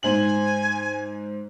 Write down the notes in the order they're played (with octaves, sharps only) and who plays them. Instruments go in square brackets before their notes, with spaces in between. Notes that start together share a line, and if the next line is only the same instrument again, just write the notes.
[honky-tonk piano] G#2 C5 F#7 [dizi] G#5